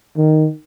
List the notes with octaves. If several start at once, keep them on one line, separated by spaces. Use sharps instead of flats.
D#3